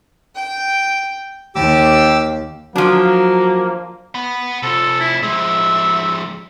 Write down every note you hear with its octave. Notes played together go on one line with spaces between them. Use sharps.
G5
D#2 G4 D6 E6
F3 F#3 A#3 D4
F#5 B5
C3 F4 A4
E4
F3 G#3 E5